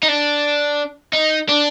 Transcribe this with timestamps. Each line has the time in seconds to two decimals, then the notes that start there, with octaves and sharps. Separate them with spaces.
0.03 D#4
0.08 D4
1.13 D#4
1.49 D4